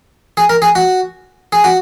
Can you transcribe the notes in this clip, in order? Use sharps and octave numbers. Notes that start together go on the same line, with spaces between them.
G#4
A#4
G#4
F#4
G#4
F#4